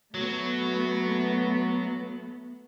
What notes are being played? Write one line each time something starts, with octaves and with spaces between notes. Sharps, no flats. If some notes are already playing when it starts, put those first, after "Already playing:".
F#3 A3 B3